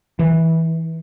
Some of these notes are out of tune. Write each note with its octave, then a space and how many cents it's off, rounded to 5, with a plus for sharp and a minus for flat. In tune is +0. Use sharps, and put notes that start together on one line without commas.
E3 -20